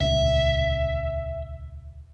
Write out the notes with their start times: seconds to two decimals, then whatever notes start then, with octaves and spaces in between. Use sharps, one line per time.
0.01 D#1 C#2 E5